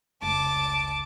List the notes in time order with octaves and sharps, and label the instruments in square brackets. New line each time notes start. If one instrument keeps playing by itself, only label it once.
[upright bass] F1 C#2 [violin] A5 D6